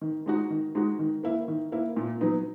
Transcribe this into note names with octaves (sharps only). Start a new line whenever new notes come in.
D#3
G#3 D#4 F#4
D#3
G#3 D#4 F#4
D#3
A#3 E4
D#3
A#3 E4
A#2
F#3 B3 D#4